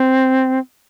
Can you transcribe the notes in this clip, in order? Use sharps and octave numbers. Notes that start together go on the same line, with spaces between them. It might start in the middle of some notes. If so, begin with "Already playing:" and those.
Already playing: C4